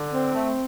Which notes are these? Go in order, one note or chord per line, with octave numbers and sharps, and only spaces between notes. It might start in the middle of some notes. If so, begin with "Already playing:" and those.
Already playing: D3
C4
A3